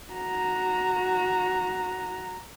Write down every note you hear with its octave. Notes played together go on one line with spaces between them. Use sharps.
F#4 A#5